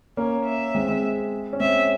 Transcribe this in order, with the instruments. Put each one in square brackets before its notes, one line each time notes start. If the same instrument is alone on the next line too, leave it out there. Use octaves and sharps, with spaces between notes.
[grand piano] A#3 C#4 [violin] C#5
[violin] E5
[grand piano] G#3 C4
G#3 C4
C#4
[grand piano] G#3 C4 [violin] E5